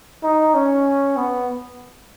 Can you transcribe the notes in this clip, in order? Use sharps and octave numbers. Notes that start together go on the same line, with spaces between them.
D#4
C#4
B3